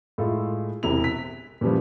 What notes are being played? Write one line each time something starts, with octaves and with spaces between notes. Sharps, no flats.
A2 G#3 F4 A4
E1 C3 E4 F7
B6
A#2 C#3 E3 F3 G3